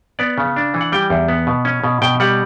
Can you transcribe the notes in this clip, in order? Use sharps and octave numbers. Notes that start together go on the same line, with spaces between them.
B3 D5
C#3
D4
E3
F#5
G3 G5
E2
B3
B2
C#4
B2
B2 G5
G3 F#5